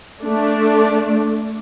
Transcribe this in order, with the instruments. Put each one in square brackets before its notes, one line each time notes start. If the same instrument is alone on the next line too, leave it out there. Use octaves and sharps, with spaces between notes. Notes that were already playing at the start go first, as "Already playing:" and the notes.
[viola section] A3 D4